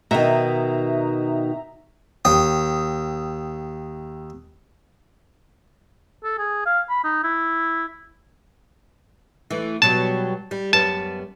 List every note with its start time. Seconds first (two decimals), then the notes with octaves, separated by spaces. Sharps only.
0.11 B2 D#3 E5 A#5
2.25 D#2 G5 D#6
6.24 A4
6.38 G#4
6.66 F5
6.89 B5
7.04 D#4
7.24 E4
9.51 E3 A3
9.82 B2 F#3 G3 A5
10.51 G3
10.73 F#2 G3 B3 A5